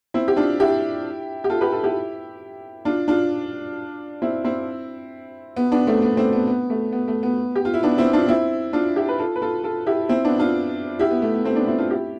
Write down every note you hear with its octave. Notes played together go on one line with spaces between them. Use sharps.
C4 E4
G4
D4 F4
E4 G4
G4
F4 A4
G4 B4
F4 A4
E4 G4
D4 F4
D4 F4
C4 E4
C4 E4
B3
B3 D4
A3 C4
B3
A3 C4
B3
B3
A3
B3
A3
B3
G4
F4
E4
B3 D4
C4 E4
D4 F4
C4 E4
D4 F4
E4 G4
B4
F4 A4
B4
F4 A4
F4 A4
E4 G4
C4 E4
B3 D4
D4 F4
E4 G4
B3
A3
B3
A3 C4
B3 D4
C4 E4
D4 F4
E4 G4